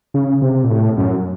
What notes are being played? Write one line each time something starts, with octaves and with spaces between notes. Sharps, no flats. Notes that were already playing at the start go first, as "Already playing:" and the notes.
C#3
C3
A#2
A2
F#2